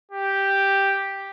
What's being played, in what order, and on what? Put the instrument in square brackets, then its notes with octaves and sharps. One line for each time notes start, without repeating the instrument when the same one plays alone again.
[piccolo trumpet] G4